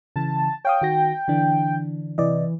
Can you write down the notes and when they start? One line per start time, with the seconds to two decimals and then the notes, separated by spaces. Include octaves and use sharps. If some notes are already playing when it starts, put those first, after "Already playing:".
0.16 C#3 E3 A5
0.65 C#5 F5 G5 D#6
0.82 D#3 F#4 A#6
1.28 D3 E3 D4
2.18 C3 E3 D5 D#5